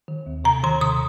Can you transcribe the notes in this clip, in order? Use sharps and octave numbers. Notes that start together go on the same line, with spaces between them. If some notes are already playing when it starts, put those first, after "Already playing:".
D#3
D#2
C3 A#5
D#3 C6
C3 D#6